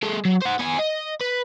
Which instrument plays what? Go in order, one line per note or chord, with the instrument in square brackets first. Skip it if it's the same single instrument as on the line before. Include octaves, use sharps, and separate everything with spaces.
[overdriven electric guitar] G#3 A4
F#3
C5 F#5
B3 G#5
D#5
B4